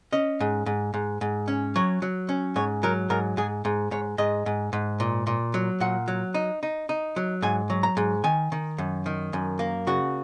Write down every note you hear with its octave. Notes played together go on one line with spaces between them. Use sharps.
C#4 D#5
G#2
G#2
G#2
G#2
C#4
F#3 C#5
F#3
C#4
G#2 C#5
F#3 A#4
G#2 A#4
G#2 G#4
G#2
G#2 C#5
G#2 D#5
G#2
G#2
A#2
A#2
F#3
A#2 F#5
F#3
D#4
D#4
D#4
F#3
G#2 G#5
F#3
A#5
G#2
D#3 G#5
D#3
F#2
D#3
F#2
A#3
C#3 F#4